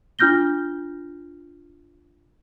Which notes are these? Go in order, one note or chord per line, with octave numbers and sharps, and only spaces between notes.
D4 F4 F6 G6 A#6 G7